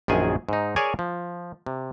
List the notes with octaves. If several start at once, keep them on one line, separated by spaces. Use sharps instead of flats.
A#1 F#2 D#3 G#4 G#5
G#2 D#4
G#4 A#4 C#5 D5 G#5
F3
C3